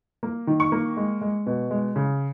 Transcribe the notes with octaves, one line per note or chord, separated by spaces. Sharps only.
A#3
D#3
C#6
A#3
G#3
G#3
B2
G#3
C#3